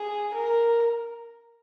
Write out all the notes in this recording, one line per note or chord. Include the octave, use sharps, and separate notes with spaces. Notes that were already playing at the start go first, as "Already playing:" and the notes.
Already playing: G#4
A#4